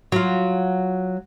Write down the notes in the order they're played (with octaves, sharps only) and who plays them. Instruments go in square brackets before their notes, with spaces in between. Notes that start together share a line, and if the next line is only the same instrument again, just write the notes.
[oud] F#3 F4